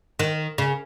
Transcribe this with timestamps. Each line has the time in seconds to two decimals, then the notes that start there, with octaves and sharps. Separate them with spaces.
0.19 D#3
0.58 C#3